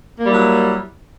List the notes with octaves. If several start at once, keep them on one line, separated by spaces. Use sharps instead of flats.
F#3 G3 A#3 E4